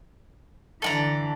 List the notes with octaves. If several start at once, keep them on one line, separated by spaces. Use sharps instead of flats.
D3 E3 A4 D5 A#5